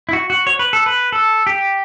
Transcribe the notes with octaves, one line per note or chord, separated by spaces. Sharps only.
E4
F#4
F#4
C#5
B4
A4
B4
A4
G4